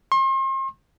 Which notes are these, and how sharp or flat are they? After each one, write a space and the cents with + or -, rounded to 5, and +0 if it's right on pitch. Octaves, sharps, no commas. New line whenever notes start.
C6 +40